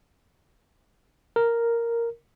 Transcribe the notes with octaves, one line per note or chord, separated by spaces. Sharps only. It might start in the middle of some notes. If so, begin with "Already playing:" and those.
A#4